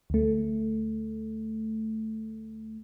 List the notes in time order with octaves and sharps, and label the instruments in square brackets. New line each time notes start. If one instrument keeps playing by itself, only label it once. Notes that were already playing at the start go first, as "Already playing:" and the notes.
[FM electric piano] D2 A3